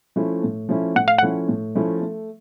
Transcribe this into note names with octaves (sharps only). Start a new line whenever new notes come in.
F3 A3 C#4 E4
A2
F3 A3 C#4 E4
A2 F#5
F5
F3 A3 C#4 E4 F#5
A2
F3 A3 C#4 E4
A3